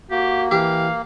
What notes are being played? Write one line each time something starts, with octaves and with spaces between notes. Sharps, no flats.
A#3 F#4 G4
E3 G4 F5